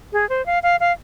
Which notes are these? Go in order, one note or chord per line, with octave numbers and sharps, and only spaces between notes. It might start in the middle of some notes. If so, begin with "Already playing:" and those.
G#4
C5
F5
F5
F5